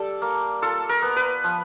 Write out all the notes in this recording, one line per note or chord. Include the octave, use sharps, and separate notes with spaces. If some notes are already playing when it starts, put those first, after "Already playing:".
Already playing: G3 A4 D5
A#3
F4 A4
A#4
B3
B4
F3